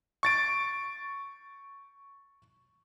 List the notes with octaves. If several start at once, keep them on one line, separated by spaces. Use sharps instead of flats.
C#6 A6 D7